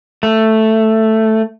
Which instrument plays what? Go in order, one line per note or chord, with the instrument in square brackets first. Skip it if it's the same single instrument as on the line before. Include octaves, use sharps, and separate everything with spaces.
[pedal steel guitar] A3